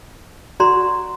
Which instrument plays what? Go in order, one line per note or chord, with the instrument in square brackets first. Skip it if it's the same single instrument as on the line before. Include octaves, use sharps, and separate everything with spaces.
[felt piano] F#4 [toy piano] D5 A#5 C6